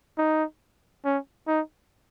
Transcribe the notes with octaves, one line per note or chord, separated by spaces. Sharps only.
D#4
C#4
D#4